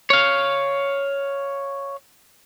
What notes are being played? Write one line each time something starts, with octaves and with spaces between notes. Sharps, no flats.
C#5 F5